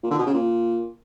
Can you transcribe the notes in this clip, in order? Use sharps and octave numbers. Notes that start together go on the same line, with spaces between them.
A#2
D3
B2
C#3
A#2